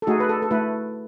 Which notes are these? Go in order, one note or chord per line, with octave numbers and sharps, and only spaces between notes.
A4
A3 D#4 F#4 G#4
B4
A4
A4
A3 E4 B4